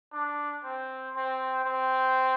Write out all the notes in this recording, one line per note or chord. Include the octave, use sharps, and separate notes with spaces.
D4
C4
C4
C4